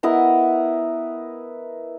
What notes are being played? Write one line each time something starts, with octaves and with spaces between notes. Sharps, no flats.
B3 E4 A#4 D#5